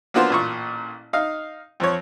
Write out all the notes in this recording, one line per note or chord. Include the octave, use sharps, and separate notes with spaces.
A#3 B3 D4 F4 F#4 C5
A1 A#2 C#6
D#4 F5
F2 F3 C#5